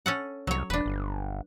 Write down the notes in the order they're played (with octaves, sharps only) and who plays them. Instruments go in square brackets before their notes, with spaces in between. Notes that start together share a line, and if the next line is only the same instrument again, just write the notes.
[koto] C#4 A4 F#5
[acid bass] C2 [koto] F#3 C#5
[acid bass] E1 [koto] D4 B4
[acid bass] G1